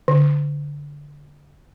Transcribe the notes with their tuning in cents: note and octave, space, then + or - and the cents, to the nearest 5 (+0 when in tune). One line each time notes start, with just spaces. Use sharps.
D3 -15